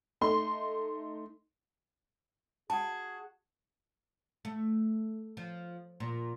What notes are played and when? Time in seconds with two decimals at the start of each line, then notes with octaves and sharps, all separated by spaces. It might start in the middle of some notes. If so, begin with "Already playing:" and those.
0.21 A3 D#4 C6
2.70 F#4 G#4 A5
4.45 A3
5.37 F3
6.00 A#2